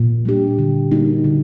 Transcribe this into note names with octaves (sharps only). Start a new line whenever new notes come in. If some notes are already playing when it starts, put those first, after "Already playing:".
Already playing: A#2
G3 A#3 D4 G4
D3
G3 A#3 D#4 F#4
D3